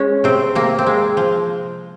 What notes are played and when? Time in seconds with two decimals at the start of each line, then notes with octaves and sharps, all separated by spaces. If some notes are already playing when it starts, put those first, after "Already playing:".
Already playing: G#3 C#4
0.24 C3 C4
0.55 C3 A#3
0.79 C4
0.87 G#3
1.17 F3